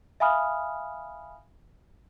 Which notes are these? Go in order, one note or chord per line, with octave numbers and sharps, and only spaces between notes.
E5 F5 G#5 B5 D#6 F6